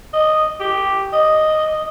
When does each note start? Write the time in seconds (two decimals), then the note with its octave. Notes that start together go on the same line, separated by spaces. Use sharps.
0.13 D#5
0.60 G4
1.13 D#5